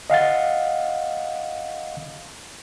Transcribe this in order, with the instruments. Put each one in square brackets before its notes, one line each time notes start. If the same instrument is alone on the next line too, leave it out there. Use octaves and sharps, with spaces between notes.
[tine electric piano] D#5 F5 F#5 A6